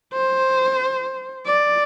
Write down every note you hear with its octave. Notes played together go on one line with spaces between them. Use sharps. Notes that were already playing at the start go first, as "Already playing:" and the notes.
C5
D5